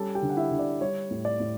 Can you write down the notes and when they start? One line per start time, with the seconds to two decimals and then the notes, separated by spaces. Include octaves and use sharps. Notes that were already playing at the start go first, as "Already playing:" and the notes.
Already playing: G3 C#4 A4 A5
0.15 G4 G5
0.22 D3
0.29 F#5
0.37 E4 E5
0.51 D3
0.59 D5
0.81 G3 C#5
1.11 A2
1.25 D5
1.40 A2